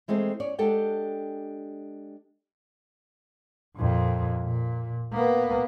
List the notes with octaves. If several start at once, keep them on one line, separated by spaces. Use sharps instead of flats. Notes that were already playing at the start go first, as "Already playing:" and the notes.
E3 G#3 A3 C4
C#4 C#5 D5
G#3 D4 G4 A4 F#5 G5
F2 A#2
A#2
A#3 B3